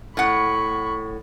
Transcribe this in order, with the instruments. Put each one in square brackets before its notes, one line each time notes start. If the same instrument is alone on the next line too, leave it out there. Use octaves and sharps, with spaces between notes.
[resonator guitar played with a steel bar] A2 F#5 [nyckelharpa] B5 C#6